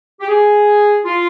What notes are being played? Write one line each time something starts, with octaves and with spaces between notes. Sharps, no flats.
G4
G#4
F4